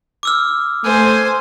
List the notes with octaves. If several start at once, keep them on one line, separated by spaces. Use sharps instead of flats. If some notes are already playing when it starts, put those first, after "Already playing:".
D6 E6 F6
A3 C5 G#5